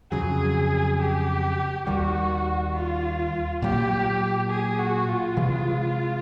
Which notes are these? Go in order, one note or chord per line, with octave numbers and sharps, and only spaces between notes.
F2 C#3 F#3 G#4
G4
D#2 D#3 G3 F#4
F4
A#2 F#3 A#3 G4
G#4
F#4
F4
C3 E3 G#3